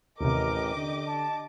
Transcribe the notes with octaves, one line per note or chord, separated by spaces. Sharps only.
A1 D#2 C3 G4 A#4 D#5 D6
D3
A5